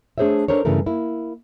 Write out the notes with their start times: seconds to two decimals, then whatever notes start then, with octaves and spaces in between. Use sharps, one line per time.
0.18 A3 D4 G#4 C5 C#5 E5
0.48 D4 A4 A#4 C5 C#5
0.65 G2 C#3 E3 A3 A#4
0.86 A#3 E4